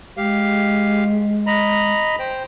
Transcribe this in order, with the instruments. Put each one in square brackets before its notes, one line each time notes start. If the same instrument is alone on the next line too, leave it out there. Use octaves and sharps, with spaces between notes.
[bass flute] G#3 [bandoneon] G4 F5
[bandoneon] D#5 A#5 B5
C5 G5